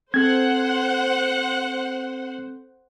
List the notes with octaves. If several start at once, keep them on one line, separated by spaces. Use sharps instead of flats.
C4 A4 C5 F#5 G#6